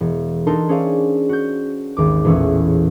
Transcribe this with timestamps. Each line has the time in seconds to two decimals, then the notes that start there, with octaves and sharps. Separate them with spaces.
0.01 E1
0.47 D4 D#4 A4 A#4 A5 C6
0.69 C#4 G#4 C5 D5 F5
1.29 F#4 G6
1.97 G#1 D#2 D6
2.25 A1 E2 A#2 C#4 E6